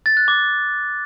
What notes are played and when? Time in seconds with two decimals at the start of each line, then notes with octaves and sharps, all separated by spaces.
0.06 A6
0.17 F#6
0.28 D6